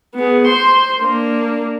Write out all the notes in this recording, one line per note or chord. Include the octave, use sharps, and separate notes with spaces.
B3 G#4
C5 C6
A#3 D4